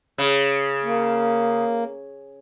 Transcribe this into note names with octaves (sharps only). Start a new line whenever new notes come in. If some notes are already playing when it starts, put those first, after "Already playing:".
C#3
A#3